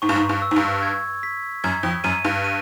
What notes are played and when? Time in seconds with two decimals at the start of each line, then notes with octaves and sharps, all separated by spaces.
0.02 G#2 C#6
0.09 G2
0.16 G#2
0.29 G2
0.42 E6
0.51 G#2
0.56 G2
0.83 G#6
1.23 B6
1.64 F#2 G#6
1.83 F2
2.04 F#2 D#7
2.25 G2
2.44 D#7